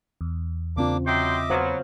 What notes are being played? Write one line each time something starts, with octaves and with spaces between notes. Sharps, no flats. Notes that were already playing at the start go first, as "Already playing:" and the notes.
E2
C#3 A#3 C4 D4 F4 D6
F#3 D#5 E5 G5 C6 D6
F#3 B3 C5 F5